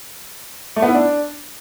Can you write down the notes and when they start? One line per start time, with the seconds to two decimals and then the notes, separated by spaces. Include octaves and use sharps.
0.76 A3
0.82 B3
0.88 E4
0.94 D4